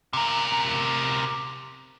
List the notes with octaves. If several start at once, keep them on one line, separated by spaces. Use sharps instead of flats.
C3 A#4